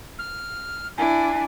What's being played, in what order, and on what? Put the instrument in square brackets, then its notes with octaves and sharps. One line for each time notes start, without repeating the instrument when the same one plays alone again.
[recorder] F6
[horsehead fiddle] D4 E4 [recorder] G#5